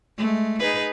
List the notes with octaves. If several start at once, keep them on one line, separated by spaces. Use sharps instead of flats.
G#3 A3
D#4 G#4 B4